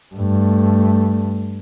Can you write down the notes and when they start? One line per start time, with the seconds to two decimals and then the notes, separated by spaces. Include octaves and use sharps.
0.15 G2 A3